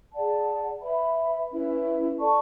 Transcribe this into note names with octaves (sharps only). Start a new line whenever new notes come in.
G#4 D5 F#5 A5
B4 E5 B5
C#4 E4 B4 E5
A4 D5 A5 C#6